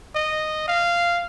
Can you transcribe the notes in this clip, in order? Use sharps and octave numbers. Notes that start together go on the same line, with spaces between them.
D#5
F5